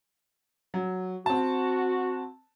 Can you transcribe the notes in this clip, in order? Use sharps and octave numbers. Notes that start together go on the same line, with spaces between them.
F#3
C4 F#4 A5